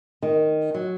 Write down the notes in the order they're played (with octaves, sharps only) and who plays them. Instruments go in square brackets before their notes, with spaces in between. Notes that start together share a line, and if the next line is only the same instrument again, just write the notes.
[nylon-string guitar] D#3
F#3